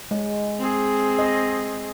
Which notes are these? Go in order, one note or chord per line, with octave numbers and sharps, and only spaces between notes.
G#3
C4 G#4
D#5